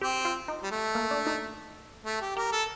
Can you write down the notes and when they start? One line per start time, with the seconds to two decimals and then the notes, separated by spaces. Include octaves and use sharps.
0.01 C4 G4
0.25 F4
0.48 D#4
0.62 G3
0.71 A3
0.95 A#3
1.11 D4
1.27 D#4
2.05 A3
2.21 G4
2.37 G4 A#4
2.52 A4